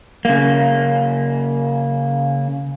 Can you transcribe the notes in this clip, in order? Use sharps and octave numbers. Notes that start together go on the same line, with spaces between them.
C#3 A#3